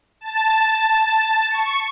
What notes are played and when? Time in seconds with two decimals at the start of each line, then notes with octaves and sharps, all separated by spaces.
0.21 A5
1.49 C#6